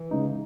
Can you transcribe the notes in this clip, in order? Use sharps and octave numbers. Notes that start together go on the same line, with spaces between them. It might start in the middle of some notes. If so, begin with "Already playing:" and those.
Already playing: E3
C#3 G#3 D#4